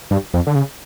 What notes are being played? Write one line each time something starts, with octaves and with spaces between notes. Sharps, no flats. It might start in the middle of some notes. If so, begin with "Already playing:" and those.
G2
F2
D3
C#3